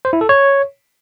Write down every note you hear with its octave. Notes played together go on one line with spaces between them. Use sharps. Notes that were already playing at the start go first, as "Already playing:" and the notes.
C5
E4
A4
C#5